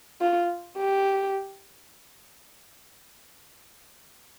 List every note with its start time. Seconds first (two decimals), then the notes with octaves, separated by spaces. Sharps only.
0.21 F4
0.78 G4